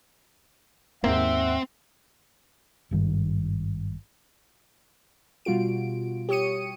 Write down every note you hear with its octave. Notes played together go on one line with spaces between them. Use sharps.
D#2 G#2 A#3 C4 E5 F#5
G#1 G2 D#3
B2 G3 F4 F#4 D7
G4 C#5 D#6 C#7 D#7